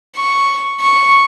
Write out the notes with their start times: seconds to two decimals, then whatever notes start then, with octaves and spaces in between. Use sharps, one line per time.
0.16 C#6
0.80 C#6